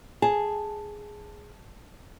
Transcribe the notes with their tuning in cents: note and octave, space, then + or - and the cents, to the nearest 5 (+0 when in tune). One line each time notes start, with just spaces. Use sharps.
G#4 +0 A5 +0